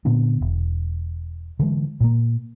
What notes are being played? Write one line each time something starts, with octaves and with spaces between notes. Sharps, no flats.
A#2 D3 B3 D4
E1
D3 E3 G#3
A#2 A#3